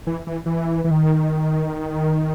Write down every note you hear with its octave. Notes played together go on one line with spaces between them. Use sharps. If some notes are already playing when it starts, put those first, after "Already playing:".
E3
E3
E3
E3
D#3